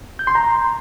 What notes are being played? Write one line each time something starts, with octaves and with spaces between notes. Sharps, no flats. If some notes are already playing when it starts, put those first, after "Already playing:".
G6
C6
A#5